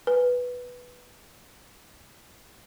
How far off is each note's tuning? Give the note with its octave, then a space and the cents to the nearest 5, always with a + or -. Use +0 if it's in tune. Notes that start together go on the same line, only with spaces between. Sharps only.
B4 +0